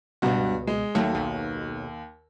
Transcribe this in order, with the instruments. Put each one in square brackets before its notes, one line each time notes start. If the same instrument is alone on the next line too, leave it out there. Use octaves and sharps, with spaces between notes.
[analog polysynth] C#2 B2 [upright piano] G2 F#4
[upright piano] G#3
[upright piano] D#2 [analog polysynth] F#3 A3
[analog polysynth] B1